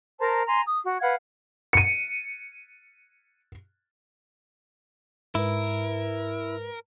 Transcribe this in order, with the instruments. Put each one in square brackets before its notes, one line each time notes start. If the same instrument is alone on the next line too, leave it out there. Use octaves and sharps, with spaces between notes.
[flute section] A#4 C5 A5 A#5
G#5 A#5 C6
D#6
F#4
B4 F5 F#5 G#6
[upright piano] C#7 D#7
[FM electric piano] G#2 B4 [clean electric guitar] E4 [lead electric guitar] A#4